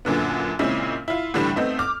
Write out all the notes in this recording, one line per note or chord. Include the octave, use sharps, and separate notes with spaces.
F#2 A#2 D3 B3
A#2 C#3 G#3 C4 C#4 E4
E4 F4
A2 D3 E3 G3 E7
A3 B3 C4 D#4
D6 F6